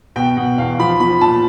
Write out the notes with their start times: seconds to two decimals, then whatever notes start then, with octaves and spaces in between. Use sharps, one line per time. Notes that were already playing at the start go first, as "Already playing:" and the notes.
0.16 B2 G5
0.37 B2 F#5
0.58 E2 F5
0.79 F3 B5
1.00 F3 B5
1.21 A#2 A5